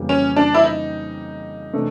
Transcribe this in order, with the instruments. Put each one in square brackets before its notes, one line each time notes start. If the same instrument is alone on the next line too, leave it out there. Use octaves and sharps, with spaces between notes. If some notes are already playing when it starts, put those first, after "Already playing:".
Already playing: [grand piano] F2 C#3 E3 G3 A#3
[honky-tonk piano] C#4
D4
E4
D#4
[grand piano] C3 E3 A3 D4